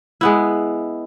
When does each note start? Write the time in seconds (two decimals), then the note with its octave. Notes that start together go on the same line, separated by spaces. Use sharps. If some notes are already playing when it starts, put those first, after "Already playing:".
0.21 G#3 B3 E4